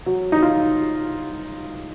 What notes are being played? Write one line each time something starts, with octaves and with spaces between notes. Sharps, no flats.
F#3
D#4
F4